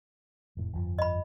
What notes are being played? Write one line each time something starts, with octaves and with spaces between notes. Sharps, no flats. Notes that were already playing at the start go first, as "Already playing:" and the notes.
F1 A2
G1 F2 F3
D#5 B5